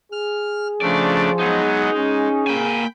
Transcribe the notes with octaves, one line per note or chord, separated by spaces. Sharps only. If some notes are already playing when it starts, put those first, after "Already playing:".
G#4 F6
C#3 F3 A3 D4 D5
F#3 G#3 B3 D#4
G#3 C#4
A#3 G5 G#5 B5